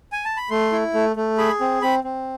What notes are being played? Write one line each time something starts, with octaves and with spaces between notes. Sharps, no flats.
G#5
A5
B5
A3 C6
E4
A3
A3
G#4 B5
C4
C4 B5
C4